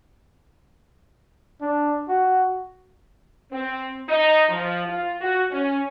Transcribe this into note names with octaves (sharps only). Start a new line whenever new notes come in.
D4
F#4
C4
D#4
F3
F4
F#4
C#4